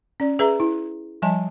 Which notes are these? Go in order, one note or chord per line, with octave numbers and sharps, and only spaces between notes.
C#4 D5
G#4 B4 E5 A#5
E4
F3 G3 D#5 G#5 A5